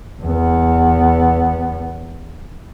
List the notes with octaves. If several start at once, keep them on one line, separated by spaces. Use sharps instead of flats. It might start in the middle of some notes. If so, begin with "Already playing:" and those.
E2 B3